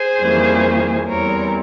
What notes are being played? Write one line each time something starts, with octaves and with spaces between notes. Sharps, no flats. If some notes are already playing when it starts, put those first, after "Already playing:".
Already playing: G#4 C5
F2 E3 G3 A#3 C#4
E2 E3 G3 C4 A#4 C#5